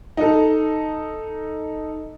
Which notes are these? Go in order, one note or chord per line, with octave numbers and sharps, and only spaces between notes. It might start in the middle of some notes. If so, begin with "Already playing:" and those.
D#4 A4